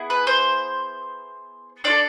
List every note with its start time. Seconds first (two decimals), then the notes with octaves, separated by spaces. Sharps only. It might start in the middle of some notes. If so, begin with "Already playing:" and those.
Already playing: B3 E4 G#4
0.10 B4
0.27 C5
1.84 D4 F4 D5
1.90 A4